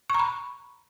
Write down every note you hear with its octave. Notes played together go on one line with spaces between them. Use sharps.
A#5 B5 C#6